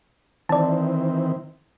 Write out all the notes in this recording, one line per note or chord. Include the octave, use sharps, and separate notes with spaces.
D#3 E3 C4 D5 A5